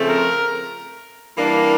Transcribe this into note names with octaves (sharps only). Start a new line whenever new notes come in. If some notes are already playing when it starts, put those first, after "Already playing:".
Already playing: C#3 F3 A3 C4
A#4
E3 G3 A#3 D4